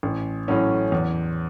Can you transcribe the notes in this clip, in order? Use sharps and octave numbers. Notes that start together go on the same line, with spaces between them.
A1
A2 F#3 C#4
E2